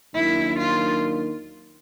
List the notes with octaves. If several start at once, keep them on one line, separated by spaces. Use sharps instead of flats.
D#2 D#3 F#3 A#3 D4 E4
F4